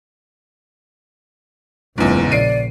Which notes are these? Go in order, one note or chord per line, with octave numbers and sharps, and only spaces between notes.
F#1 E2 G#2 C#3 F4
A#1 D5 C7 D7 D#7